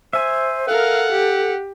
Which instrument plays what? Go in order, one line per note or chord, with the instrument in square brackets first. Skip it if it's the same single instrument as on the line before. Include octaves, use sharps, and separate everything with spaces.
[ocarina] C5 [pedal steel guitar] E5 G#5
[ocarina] A4 [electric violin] A#4 F5 [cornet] F#5
[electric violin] G4